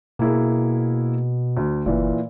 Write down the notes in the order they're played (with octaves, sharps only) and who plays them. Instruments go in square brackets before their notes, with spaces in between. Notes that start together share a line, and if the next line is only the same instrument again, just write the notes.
[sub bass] B2 [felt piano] A#3 E4 G#4
[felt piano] D2
[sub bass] F#1 [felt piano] A#2 E3